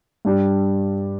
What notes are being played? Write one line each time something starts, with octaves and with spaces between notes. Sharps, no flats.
G2 G3 D4 G4